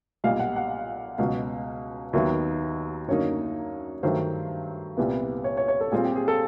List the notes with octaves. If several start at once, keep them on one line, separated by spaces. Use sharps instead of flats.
B1 A#2 G3 F5
F#5
F#5
C#2 B2 F#3 F5
D#2 D#3 F#3 B3 D#4 E5
F#2 D3 F#3 A#3 D#4 C#5
G2 D#3 F#3 A3 C5
C2 A#2 G3 B3 E4
C#5
C#5
C#5
A4
A#2 G3 C4 F4 G#4
G4
G#4
A4